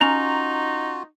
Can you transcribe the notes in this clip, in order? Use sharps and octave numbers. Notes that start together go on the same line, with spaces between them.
C#4 D#4 F4 F#4 A#5